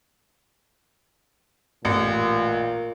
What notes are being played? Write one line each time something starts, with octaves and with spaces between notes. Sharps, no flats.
A1 A#2